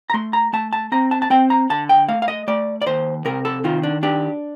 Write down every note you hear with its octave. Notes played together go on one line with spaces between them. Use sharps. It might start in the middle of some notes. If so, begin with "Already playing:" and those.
A#5
A3 C6
A#5
A3 A5
A5
C4 A#5
A5
A5
C4 G5
A#5
D3 A5
G5
A3 F5
F5
D#5
A3 D5
D5
D#2 C5
C3 A#4
A4
D#3 F4
D4
D4 G4